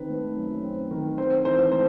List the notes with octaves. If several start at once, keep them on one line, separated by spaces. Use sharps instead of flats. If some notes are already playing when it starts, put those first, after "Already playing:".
Already playing: D#3 C4 B4
A3
F#2
C4
D#3
C4 C5
E3 C5
A3 C5